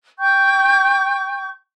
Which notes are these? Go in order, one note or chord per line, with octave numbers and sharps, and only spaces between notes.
G5 C#6 G6